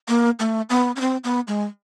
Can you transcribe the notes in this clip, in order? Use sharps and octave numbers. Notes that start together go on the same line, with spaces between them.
A#3
A3
B3
C#4
C4
B3
G#3